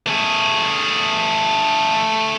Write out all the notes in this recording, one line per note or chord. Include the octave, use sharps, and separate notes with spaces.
A3 G#4